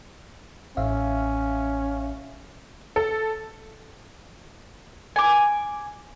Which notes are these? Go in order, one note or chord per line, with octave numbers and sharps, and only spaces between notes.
A1 C#4 E5 F5
A4
G#5 D6